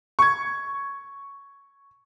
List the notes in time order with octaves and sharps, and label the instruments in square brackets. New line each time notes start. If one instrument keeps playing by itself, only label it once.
[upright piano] C#6 G#6